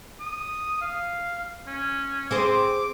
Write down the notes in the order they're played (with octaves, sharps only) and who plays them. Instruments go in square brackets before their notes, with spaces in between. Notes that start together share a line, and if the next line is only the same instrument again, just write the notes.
[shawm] D#6
F5
C#4
[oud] C4 G#4 C5 [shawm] D6